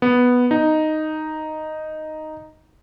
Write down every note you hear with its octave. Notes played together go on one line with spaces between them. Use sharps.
B3
D#4